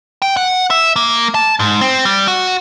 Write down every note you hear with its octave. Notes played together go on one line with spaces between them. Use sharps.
G5
F#5
E5
A#3
A5
G#2
C4
G3
F#4